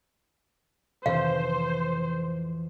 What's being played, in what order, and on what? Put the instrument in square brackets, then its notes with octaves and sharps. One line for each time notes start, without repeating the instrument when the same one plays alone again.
[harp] F2 A2 E3 [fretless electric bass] C3 D#3 [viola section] C5 [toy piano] F5